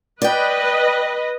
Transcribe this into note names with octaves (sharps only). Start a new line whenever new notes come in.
B4 D5 D#5 G5